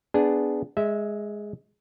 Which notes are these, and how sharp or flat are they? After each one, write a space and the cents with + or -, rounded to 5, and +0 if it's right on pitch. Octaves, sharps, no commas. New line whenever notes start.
B3 +15 D4 +0 G#4 +0
G#3 +0 E5 -20